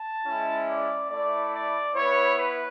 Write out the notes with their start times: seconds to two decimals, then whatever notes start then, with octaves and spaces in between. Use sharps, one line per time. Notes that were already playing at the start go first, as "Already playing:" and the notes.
Already playing: A5
0.26 G#3 C#4 E4
0.68 D5
1.10 A3 E4 D5
1.53 D5
1.95 B3 E4 C#5
2.38 B4